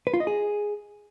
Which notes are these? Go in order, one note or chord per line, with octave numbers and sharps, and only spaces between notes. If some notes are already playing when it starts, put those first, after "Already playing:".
B4
F4
D#5
G#4